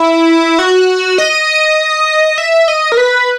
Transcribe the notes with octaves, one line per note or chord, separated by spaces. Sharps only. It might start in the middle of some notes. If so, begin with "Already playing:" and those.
Already playing: E4
F#4
D#5
E5
D#5
A#4
B4